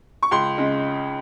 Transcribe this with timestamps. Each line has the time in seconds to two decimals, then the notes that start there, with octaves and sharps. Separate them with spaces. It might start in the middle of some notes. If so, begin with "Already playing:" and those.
0.23 C#6
0.31 C#2 C6
0.58 C#3 G#3